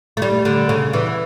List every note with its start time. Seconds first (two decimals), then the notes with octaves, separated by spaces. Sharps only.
0.17 A3
0.22 G3
0.45 D3
0.69 C#3
0.93 E3